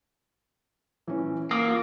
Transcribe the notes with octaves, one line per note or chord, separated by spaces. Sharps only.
E3 C#4
A#3 D#6
F4 F#4